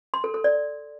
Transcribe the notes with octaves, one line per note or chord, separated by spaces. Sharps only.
C6
A4
A4
D5